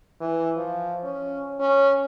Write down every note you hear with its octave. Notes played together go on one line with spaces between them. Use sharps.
E3
F3
C#4
C#4